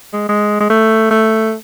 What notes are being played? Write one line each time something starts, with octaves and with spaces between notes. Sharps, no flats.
G#3
G#3
G#3
A3
A3